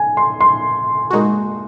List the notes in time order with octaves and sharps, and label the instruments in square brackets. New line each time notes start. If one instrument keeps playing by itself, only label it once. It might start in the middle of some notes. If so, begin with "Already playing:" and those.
Already playing: [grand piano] G#5
C6
C6
[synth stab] A#2 G#3 D#4 F#4